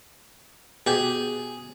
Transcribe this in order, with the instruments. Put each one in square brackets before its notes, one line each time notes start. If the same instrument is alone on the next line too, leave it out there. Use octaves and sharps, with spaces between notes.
[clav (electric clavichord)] B2 G4 [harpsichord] G#4